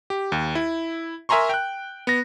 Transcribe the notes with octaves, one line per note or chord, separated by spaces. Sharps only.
G4
D#2
E4
A#4 E5 G#5 A#5 C6 C#6
G5 F#6
B3 A#6